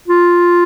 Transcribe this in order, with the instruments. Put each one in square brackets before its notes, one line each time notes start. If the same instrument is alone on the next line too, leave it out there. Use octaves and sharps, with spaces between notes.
[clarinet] F4